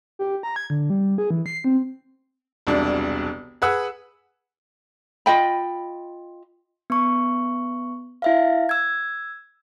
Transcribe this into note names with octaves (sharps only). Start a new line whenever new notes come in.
G4
A#5
G#6
D3
G3
G#4
E3
C7
C4
E1 C2 D4
G#4 B4 F#5 E6
F4 D#5 G5 B5
B3 C#6
E4 E5 F5
E6 G#6